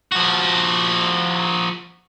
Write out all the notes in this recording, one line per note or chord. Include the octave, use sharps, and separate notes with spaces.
F3 F#4